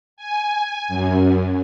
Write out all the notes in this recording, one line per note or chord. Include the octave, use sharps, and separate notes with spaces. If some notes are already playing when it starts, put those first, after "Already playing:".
G#5
F#2